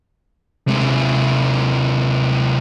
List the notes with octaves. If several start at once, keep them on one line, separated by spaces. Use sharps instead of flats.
C3 G#3